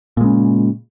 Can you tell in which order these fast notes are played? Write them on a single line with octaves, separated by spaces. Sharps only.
A#2 G#3 C#3